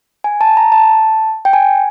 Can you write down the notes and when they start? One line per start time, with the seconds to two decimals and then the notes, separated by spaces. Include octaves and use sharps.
0.24 G#5
0.41 A5
0.57 A#5
0.72 A5
1.45 G5
1.53 G#5